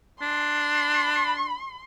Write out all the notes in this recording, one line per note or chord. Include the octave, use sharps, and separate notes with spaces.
D4 C6